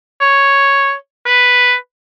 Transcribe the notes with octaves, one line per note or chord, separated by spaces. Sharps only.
C#5
B4